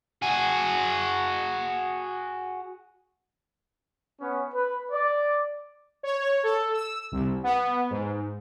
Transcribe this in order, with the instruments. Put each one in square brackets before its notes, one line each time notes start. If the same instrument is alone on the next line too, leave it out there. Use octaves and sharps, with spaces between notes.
[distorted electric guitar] F#4 G#4
[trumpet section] B3 C#4
B4
D5
[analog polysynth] C#5
C#5
A4
E6
C2
B3
G#2